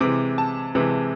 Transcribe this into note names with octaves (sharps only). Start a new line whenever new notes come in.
C3 E3 G#3 D6
A5
C3 E3 G#3